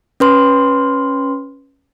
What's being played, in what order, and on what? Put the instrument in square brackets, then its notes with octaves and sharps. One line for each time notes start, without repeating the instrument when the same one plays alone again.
[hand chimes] C#4 B4 C6